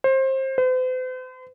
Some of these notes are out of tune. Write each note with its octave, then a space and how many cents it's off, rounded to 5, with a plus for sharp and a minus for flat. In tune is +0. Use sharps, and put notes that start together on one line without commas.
C5 +25
C5 -45